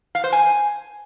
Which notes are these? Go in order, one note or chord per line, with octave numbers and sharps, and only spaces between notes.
F5
C5
G#5